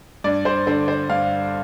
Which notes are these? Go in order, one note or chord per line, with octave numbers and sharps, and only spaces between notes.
G2 D5
C5
D3 C5
C5
G2 F5